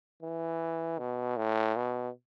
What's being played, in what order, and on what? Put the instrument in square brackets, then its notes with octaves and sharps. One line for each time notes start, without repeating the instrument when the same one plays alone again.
[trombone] E3
B2
A2
B2